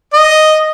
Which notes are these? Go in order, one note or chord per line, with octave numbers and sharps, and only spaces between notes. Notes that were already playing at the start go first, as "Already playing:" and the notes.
D#5